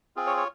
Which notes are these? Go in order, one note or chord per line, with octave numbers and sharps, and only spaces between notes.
C4 F4 G#4
C#5
C#5